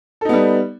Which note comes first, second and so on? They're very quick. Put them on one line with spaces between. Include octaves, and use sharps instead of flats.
A4 D#4 B3 G3